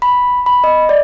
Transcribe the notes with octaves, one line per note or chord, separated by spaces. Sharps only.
B5
B5
D#5
D5